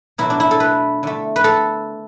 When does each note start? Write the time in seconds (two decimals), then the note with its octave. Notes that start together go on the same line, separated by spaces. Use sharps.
0.18 B2 F#3 A3 E4
0.30 D4
0.40 E4
0.51 A4
0.60 B4
1.03 D3 A3
1.36 B4
1.44 A4